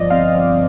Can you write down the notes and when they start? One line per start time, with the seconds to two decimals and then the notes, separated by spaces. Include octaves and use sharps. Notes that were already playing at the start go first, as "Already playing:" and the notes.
Already playing: G1 F3 D5 D#5
0.10 C4 F5
0.35 F3